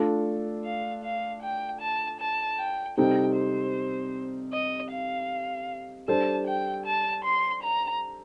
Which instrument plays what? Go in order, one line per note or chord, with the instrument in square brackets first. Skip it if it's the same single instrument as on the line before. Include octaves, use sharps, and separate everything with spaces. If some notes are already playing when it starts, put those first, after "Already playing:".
Already playing: [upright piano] A3 D4 F4 A4 D5
[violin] F5
F5
G5
A5
A5
G5
[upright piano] C3 G3 C4 D#4 A4 [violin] G5
[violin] C5
D#5
F5
[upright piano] G3 D4 A4 C5 [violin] A5
[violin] G5
A5
C6
A#5